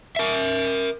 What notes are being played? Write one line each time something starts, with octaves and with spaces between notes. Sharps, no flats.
A#4 E5